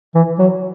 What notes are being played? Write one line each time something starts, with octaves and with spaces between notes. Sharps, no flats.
E3
F#3